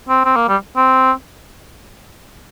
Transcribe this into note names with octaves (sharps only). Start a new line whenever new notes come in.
C4
C4
A#3
G3
C4